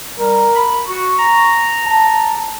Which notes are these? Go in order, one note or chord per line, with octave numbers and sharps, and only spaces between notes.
G3 A#4
B5
F#4 C#6
A#5
A5